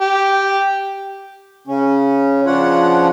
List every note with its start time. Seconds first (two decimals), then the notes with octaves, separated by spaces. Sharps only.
0.01 G4
1.68 C#3 C#4
2.46 C#3 F3 D4 F4 C#5 F#5